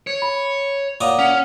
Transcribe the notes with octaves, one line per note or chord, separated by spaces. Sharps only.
C#5
B5
A#2 C#5 F5 F#5 D6 D#6
C#4 F#5